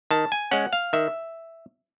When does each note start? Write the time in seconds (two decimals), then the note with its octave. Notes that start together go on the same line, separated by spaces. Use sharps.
0.11 D#3 A5
0.32 G#5
0.51 G#3 C#4 F#5
0.73 F5
0.93 D#3 E5